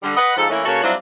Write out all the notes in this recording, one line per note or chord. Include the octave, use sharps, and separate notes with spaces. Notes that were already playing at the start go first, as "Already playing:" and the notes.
D3 G3
B4 D#5 F#5
G#2 F3 A4
E3 A3 A#3 C#4 E4
C#3 A#3 F#4 A4 C#5
F#3 G3 C4 D4 E4 F4